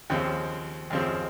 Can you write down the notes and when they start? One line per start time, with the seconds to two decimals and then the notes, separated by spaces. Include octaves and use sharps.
0.10 D#2 C#3 F3 C4
0.90 D#2 C#3 F3 C4